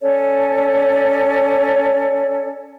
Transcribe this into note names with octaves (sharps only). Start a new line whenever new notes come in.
C#4 A4 C#5 D5